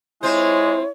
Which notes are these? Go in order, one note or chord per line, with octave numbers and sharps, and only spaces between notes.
G#3 C4 E4 F4 C5 C#5